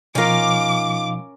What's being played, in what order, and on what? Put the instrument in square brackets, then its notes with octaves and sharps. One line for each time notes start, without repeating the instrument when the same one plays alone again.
[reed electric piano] B2 F3 [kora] C#4 A#4 [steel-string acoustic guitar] D#4 F4 [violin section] D6